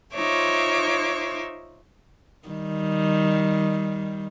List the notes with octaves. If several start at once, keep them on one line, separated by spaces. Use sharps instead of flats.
D#4 F4 C5 C#5 E5 D6
D#3 G3